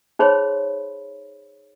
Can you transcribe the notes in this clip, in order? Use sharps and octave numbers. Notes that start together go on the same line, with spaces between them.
D#4 G#4 C5 C#5 B5 C6